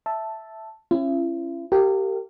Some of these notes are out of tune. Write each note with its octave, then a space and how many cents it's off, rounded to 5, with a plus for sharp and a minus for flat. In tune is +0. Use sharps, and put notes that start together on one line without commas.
E5 +0 A5 +0
C#4 -30 E4 +40
G4 -15 A#4 -35 F5 +0